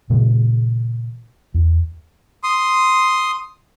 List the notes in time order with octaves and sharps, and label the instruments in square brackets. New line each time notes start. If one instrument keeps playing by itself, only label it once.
[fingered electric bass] A#2 C#3 E3 G#3
E2
[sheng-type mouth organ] C6 D#6